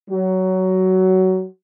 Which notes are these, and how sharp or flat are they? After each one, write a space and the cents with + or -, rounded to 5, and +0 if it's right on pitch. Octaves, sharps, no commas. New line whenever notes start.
F#3 +15